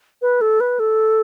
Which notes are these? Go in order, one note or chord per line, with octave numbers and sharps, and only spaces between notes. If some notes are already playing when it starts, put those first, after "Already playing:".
B4
A4
B4
A4